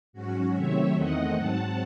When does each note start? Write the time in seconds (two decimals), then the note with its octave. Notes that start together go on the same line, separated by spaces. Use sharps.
0.13 G#2 F#3 C#4 F#4
0.54 C3 D#3 F#3 A3 C4 C#5 E5
0.95 E2 D#3 A3 C4 D#5 F#5
1.36 G#2 F#3 C4 F#5 A5